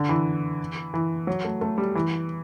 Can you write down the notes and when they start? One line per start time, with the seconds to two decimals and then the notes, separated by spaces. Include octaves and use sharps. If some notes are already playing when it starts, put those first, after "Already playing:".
Already playing: D3
0.09 E3
0.94 E3
1.27 F#3
1.44 A3
1.61 A3
1.78 G3
1.95 E3